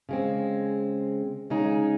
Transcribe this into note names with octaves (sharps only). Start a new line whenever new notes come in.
C#3 G#3 C4
C#3 G#3 D#4 G#4